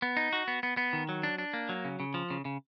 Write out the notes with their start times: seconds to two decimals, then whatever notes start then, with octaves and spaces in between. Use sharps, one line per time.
0.02 B3
0.17 D#4
0.33 F#4
0.48 B3
0.63 B3
0.77 B3
0.93 D#3
1.09 F#3
1.23 D4
1.38 D4
1.53 A#3
1.69 F#3
1.85 C#3
2.00 C#3
2.14 F3
2.30 C#3
2.45 C#3